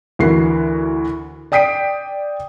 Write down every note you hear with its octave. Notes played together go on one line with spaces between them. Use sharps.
D2 E3 F#4 A#4 C7
D5 G5 D#6 B6 C7 D7